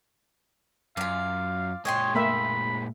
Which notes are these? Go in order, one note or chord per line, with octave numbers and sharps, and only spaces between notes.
F#2 F4 D5 F5
A#2 G#3 C#5 D#5 G5 C6
A3 A#3 E5 B5